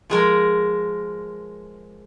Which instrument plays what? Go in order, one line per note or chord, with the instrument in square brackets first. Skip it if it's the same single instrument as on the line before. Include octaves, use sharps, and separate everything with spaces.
[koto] F3 G#3 A#4